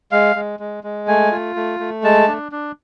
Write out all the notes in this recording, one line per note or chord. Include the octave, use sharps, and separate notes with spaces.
G#3 F5
G#3
G#3
G#3
A3 G#5
F4
A3
A3
G#3 A5
D4
D4